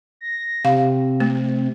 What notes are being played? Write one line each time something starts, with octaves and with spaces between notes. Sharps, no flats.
A#6
C3 F5
A3